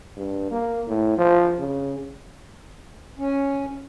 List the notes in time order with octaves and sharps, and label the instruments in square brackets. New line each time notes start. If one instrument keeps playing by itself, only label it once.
[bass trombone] G2
A#3
A2
F3
C#3
[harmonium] C#4